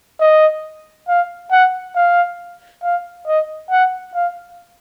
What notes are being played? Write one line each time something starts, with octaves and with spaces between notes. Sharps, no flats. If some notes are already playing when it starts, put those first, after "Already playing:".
D#5
F5
F#5
F5
F5
D#5
F#5
F5